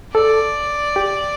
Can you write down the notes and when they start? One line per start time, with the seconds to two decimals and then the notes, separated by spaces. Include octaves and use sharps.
0.14 A4 D5
0.96 G4